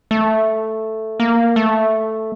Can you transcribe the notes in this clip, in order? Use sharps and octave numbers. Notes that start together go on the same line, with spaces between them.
A3
A#3
A3